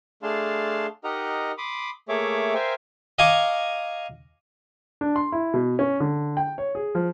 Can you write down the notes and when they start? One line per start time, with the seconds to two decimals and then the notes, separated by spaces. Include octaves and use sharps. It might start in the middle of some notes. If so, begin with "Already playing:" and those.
0.23 A3 D4 G#4 F5 A5 C6
1.04 D#4 G4 A#4 D#5 F#5 A#5
1.58 B5 C6 D6 D#6
2.09 A3 A#3 G#4 C#5 E5 D6
2.54 A#4 C5 E5 F5 G5 G#5
3.19 D#5 F5 G#5 A#5 C#6 D6
5.01 D4
5.16 C6
5.32 E4
5.54 B2
5.79 C#4
6.00 D3
6.37 G5
6.58 C#5
6.75 G#4
6.95 F3